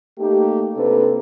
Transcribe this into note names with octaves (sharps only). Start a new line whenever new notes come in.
A3 A#3 D#4 G4
C3 A#3 D4 A4 B4